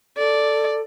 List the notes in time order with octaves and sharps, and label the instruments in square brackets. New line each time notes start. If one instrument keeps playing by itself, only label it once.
[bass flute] A4 [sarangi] D5